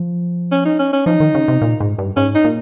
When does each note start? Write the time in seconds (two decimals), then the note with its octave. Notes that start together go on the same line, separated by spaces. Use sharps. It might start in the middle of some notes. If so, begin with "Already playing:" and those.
Already playing: F3
0.51 C#4
0.65 D#4
0.79 C#4
0.93 C#4
1.06 F3 D#4
1.20 D#3
1.35 C#3
1.48 C3
1.62 A#2
1.80 G#2
1.98 G2
2.16 G#2 C#4
2.35 D#4
2.44 A#2